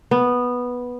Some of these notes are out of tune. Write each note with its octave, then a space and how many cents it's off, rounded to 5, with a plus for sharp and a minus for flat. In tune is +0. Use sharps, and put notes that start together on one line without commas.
B3 -5